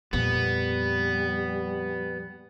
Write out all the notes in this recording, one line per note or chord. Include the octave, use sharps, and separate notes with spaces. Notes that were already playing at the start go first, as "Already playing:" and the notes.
F2 A#2 G3 B3